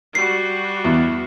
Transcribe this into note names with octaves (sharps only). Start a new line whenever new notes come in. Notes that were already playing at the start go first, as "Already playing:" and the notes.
G3 F#4 C7
E2